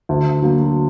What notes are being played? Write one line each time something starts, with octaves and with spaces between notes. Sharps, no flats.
D2
D3 F#3 A#3